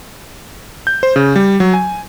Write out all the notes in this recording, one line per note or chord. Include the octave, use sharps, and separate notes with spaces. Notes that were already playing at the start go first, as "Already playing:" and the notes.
G6
C5
C#3
G3
F#3
G#5